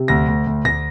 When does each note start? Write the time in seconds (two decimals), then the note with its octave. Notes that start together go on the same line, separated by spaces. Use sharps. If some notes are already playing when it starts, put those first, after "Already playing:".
Already playing: C3
0.08 D2 A#6
0.28 D2
0.47 D2
0.65 D2 A#6